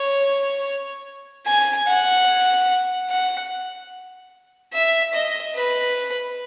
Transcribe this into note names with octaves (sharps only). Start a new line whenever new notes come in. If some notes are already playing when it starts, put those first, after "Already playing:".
Already playing: C#5
G#5
F#5
F#5
E5
D#5
B4